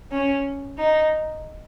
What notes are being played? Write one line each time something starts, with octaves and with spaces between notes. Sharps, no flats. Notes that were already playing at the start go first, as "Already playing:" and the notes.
C#4
D#4